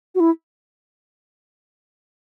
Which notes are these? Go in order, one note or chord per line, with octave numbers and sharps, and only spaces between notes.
F#4
E4